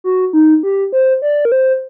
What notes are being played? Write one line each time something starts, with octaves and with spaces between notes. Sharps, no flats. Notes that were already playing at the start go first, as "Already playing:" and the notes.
F#4
D#4
G4
C5
D5
A#4
C5